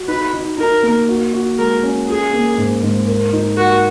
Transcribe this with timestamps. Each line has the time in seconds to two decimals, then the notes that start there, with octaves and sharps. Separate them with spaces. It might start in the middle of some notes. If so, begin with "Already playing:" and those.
Already playing: F#4
0.08 D#4 B4
0.33 D#4
0.58 D#4 A#4
0.83 A#3
1.08 F#4
1.33 F#4
1.58 G#3 A#4
1.83 C#4
2.08 F4 G#4
2.33 A#3
2.58 G#2
2.83 G#2
3.07 A#4
3.33 D#4
3.57 F#4 A#4